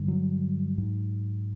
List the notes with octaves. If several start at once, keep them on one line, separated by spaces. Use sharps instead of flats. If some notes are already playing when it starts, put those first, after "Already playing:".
Already playing: G2 D3
F#3
G#2